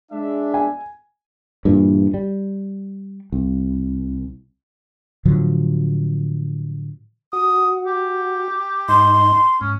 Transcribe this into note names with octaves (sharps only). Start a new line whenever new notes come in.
G#3 D4 E5
G#5
G2 A#2 E3
G3
C2
A2 D3 F3 F#3
F#4 D#6
G4
G#2 D#4 C6
G#2 C#4